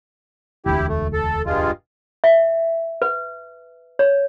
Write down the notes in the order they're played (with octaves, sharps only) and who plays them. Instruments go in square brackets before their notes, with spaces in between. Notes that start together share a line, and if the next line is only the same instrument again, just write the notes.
[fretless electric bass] E1 D2 [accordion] E4 G4
[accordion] A3
A4
G2 G#3 F4
[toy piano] E5
B4
C#5